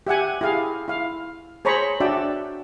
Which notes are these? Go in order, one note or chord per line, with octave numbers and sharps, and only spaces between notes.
G4 E5 F#5 G#5
E4 G4 G#4 F5
E4 F5
G#4 C5 C#5 A#5 B5 C#6
D4 F#4 D5 E5 G5 A5